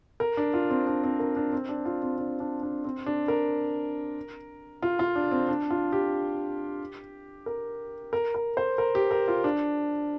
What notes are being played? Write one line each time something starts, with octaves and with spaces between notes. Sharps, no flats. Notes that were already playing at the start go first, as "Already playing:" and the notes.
A#4
D4
F4
C4
D4
C4
A#4
D4
C4
D4
F4
C4
D4
D4
D4
C4
D4
A#4
F4
F4
D4
C4
D4
F4
G4
A#4
A#4
A#4
C5
A#4
G4
A#4
F4
D4